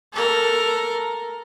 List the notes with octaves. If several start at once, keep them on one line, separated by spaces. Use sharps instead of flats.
A4 A#4